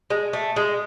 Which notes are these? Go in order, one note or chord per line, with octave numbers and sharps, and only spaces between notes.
G#3
A3
G#3